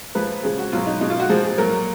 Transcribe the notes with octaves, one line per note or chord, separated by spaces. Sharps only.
A#2 F3 G#3 B4
C#3 F3 G#3 G#4
F#4
B2 F#3 F4
D#4
B2 G#3 D#4
F4
F#4
A#2 F3 G#3 G#4
G#4
A#2 F#3 A#4